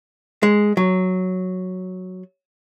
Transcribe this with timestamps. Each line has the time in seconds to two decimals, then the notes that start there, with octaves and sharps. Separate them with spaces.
0.43 G#3
0.77 F#3